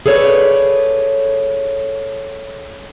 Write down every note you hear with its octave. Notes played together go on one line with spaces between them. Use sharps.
G#4 A4 B4 C#5 D5